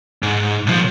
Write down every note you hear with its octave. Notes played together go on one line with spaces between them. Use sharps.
G#2
B1 F3